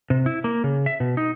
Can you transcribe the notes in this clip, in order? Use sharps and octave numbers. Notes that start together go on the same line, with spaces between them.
C3
E4
A#3
C#3
E5
B2
D#4